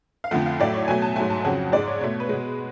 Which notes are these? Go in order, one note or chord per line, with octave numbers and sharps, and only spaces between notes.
F5
F2 D3 F3 A3 F#5
F5
A2 F#3 A3 D5
C#5
B2 F#3 A3 G#5
A5
G#2 F#3 A3 G#5
A5
F2 C#3 F#3 F#5
G#2 G#3 D5
C#5
B2 A3 C#5
B4
B2 G#3